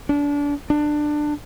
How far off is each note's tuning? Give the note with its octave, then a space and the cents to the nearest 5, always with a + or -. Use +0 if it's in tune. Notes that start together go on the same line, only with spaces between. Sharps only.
D4 -25
D4 +20